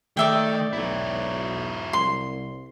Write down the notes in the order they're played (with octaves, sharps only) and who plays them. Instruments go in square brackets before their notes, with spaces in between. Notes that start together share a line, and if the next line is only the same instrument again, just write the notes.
[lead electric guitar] D#3 [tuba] A3 [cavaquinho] D5 E5 G5
[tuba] B1 [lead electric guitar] F#3 E4
[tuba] C2 [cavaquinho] C6